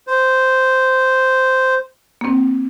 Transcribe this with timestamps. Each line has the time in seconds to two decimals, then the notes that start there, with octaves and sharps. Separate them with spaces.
0.07 C5
2.21 A#3 C4